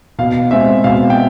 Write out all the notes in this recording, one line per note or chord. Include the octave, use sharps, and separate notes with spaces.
B2 F5
G#3 C4 E5
B2 F5
G5